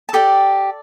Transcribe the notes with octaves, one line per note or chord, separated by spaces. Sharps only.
A5
G4 A4 D5 G5